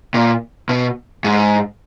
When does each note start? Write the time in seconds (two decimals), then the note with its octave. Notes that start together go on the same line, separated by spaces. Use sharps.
0.14 A#2
0.69 B2
1.24 G#2